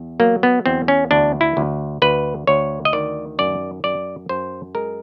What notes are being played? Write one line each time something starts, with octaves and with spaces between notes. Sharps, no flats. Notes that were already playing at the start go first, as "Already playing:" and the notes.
Already playing: E2
F#3 A#3
B3
E2 C4
C#4
D2 D4
E4
D2
D2 B4
D2 C#5
D#5
D#3 D5
F#2 D5
F#2 D5
F#2 C5
G#3 A#4